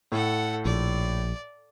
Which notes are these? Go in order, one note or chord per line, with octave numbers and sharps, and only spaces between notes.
A2 A4 F#5
A#1 D5